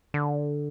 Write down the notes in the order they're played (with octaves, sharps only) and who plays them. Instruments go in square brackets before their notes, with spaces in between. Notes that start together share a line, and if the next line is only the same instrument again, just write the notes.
[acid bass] D3